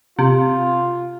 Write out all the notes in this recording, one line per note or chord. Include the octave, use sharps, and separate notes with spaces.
C3 F4